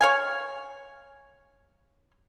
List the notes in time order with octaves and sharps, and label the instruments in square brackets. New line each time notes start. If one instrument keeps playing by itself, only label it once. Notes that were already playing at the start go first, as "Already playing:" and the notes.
[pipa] C#5 F5 G#5